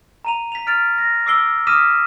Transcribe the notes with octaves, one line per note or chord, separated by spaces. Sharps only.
A#5 D#7 F7
B6 F7
F6 A6 D7 F7
A#6
D6 E6 C7 D7 G7
D6 D#6 F6 B6 D#7 E7